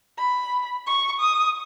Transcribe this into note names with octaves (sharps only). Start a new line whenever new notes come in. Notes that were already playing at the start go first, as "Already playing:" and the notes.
B5
C#6
D#6